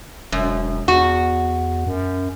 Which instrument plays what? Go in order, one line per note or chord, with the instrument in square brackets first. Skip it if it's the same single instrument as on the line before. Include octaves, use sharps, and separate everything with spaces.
[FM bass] E1 [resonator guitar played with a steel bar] F#2
[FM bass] E2 [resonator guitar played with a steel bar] F#4
[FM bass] F#2